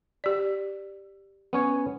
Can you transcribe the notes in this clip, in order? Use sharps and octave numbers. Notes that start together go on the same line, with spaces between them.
G4 D5
B3 C#4 C#5